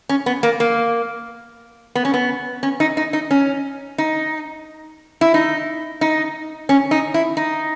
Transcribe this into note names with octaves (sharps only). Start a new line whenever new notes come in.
C#4
B3
A#3
A#3
B3
C#4
B3
C#4
D#4
D#4
D#4
C#4
D#4
E4
D#4
D#4
C#4
D#4
E4
D#4